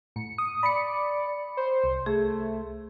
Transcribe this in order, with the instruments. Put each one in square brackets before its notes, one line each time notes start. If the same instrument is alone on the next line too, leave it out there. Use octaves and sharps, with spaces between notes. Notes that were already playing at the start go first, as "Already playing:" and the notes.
[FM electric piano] A2 [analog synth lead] C#7
[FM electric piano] D#6
[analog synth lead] D5 [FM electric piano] B5 C#7
[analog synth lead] C5
[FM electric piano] C2
[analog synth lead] A3 [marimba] G#4